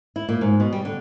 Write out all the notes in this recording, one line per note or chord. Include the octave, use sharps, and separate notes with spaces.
E4
A#2
G#2
B2
G3
D3